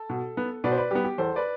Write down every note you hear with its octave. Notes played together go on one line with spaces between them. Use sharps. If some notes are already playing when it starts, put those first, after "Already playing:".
Already playing: A4
B2
B3
B2 B4 D5
C5
B4 D5
G3 B3 G4
G4
E2 A4 C5
B4 D5